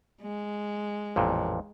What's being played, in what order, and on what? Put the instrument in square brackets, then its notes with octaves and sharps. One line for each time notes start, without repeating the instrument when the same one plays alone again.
[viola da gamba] G#3
[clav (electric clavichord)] A1 F2 A#2